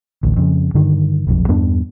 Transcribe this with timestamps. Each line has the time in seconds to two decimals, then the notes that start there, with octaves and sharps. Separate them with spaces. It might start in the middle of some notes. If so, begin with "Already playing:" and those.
0.23 A1 D2
0.37 F2 C#3
0.74 G2 D3 D#3
1.27 F1 B1 F2
1.48 E2 G2 B3 D4